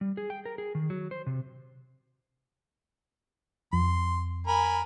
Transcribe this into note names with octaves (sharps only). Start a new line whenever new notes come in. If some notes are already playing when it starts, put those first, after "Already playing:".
G3
G#4
G5
A#4
G#4
D#3
F#3
C5
C3
F2 C6
A#4 G#5 B5